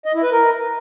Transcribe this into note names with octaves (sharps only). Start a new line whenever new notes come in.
D#5
E4
B4
A#4